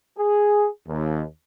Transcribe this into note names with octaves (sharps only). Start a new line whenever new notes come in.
G#4
D#2